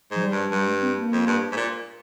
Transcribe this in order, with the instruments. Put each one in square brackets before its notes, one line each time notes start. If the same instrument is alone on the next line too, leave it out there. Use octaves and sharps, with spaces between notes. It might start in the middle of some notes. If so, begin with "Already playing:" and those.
[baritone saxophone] G#2 [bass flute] F3
[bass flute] G3
[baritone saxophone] G2
[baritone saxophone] G2 [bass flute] G3
[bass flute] G#3
C4
A#3
[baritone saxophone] F2
G2
G#2
A#2